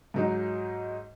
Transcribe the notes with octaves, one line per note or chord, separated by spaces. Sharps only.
G#2 F#3 D#4